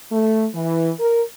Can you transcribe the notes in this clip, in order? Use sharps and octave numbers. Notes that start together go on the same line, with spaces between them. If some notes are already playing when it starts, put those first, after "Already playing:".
A3
E3
A#4